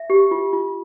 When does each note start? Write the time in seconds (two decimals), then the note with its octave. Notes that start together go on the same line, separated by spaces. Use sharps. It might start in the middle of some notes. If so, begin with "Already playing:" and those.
Already playing: E5
0.10 G4
0.31 F4
0.53 F4